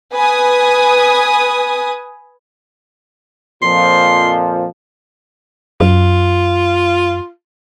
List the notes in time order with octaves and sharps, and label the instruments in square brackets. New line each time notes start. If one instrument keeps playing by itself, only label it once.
[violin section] B4 G#5 D#6
[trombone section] F2 A#2 F3 [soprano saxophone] C6
[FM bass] F#2 [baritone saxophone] F4